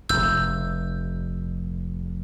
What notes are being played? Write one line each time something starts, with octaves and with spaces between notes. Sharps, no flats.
F1 E6 G6